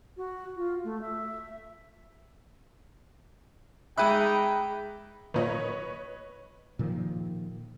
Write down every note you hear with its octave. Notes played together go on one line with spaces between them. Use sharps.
F#4
F4
A3
E5
G#3 D#4 G#4 E5 G5 B5 D6 F#6
F#2 A#2 D#3 B4 C#5 D#5
A#2 D#3 F3